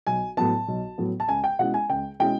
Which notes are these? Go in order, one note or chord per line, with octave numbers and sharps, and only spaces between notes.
B1 G#5
A2 F#3 B3 A5
B1
A2 F#3 B3
A5
C#2 G#5
G5
B2 G#3 C#4 E4 F#5
G#5
C#2 G5
B2 G#3 C#4 E4 G5